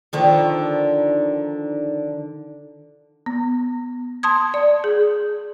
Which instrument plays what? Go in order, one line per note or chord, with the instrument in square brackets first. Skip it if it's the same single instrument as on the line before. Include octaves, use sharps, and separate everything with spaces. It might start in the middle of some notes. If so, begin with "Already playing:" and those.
[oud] D3 D#3 F3
[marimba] B3
A5 C6 D#6 G#6
D5
G#4